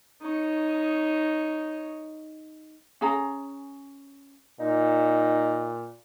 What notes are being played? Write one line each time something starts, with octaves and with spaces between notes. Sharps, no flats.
D#4 C#5
C#4 G#4 A#5
A#2 D#4